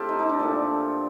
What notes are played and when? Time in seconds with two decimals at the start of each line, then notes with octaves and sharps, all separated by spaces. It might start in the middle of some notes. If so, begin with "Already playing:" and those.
Already playing: A2 A3 C4 F4 G4 A4
0.09 D#4
0.19 D#4
0.29 D4
0.39 A#2 F3 A3